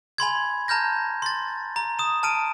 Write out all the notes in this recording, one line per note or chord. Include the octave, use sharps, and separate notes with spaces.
G#5 B5 C6 G#6
A5 A#5 F6 G6 A#6
C6 A6
A#5
D#6 E7
A5 F6 D7 D#7